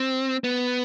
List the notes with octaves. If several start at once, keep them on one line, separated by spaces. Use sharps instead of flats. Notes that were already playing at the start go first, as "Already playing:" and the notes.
Already playing: C4
B3